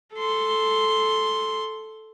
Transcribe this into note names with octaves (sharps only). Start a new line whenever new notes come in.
A4 C6